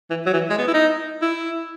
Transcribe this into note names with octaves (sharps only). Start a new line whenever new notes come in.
E3
F#3
E3
G#3
B3
E4
D#4
E4